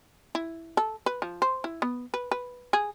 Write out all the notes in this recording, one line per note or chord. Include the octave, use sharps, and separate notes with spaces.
E4
A4
B4
F3
C5
E4
B3
B4
B4
G#4